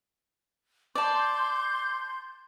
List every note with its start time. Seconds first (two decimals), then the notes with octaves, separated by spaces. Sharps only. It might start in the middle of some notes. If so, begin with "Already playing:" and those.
0.95 D5 A5 C6 G6